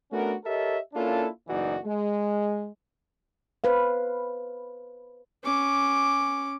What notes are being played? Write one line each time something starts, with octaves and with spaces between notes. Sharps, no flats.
A3 B3 C#4 D4 F#4 A#4
G4 A4 A#4 C#5 D#5 E5
A#3 C#4 D4 E4 F4 A4
F#1 B1 E3 D#4 F#4 D5
G#3
B4 C5 F5
C#4 D6